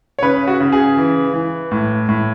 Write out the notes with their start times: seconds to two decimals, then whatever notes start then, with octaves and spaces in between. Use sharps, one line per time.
0.19 C#5
0.22 C#3 B4
0.47 F#4
0.60 C#3
0.72 G#4
0.97 E3
1.34 E3
1.71 A2
2.09 A2